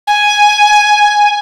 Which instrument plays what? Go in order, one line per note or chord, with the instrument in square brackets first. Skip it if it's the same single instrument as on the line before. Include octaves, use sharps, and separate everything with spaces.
[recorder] G#5